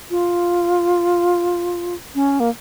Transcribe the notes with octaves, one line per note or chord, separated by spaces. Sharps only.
F4
C#4
A#3